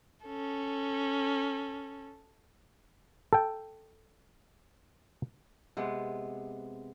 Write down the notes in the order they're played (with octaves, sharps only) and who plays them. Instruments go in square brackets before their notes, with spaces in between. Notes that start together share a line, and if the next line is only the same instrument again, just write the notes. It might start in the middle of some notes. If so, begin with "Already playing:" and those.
[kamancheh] C#4 A4
[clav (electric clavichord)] A4 G5
[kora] C3 G#3 B3